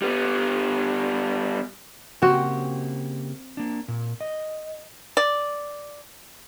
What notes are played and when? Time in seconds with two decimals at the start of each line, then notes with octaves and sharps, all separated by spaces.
0.02 G3 B3
2.22 C#3 A#3 C4 F#4 G4
3.57 A#3 D4
3.88 A#2
4.21 D#5
5.17 D5